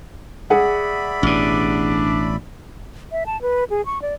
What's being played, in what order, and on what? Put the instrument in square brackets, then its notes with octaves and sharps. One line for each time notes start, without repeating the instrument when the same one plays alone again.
[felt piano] G#4 F#5 [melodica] D5 E5 B5
[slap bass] A1 B2 [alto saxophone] D4
[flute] E5
A5
B4
G#4
C#6
D5